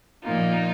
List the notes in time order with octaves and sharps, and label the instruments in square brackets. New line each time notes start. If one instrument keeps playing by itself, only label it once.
[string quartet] A#2 F3 A#3 D#4 F4